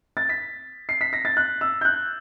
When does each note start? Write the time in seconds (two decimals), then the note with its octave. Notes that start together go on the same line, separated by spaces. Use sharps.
0.17 A6
0.29 B6
0.89 C7
1.01 B6
1.13 A#6
1.25 A6
1.37 F#6
1.61 E6
1.81 G6
1.85 F#6